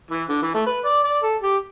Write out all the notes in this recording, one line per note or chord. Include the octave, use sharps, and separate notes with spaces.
E3
D3
E3
A3
B4
D5
D5
A4
G4